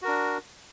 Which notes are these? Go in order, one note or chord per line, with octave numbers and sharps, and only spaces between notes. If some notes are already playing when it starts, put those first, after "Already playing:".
D4 F#4 A#4